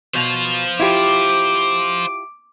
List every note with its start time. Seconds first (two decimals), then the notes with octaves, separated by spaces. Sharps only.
0.15 B2 C5 F5
0.79 E4 F4 G4 D6